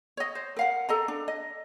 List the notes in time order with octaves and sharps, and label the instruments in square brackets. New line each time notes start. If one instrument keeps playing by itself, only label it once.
[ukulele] C#5 D#5
C5
A#4 F5 F#5
A4 D#5 A#5
D4
D#5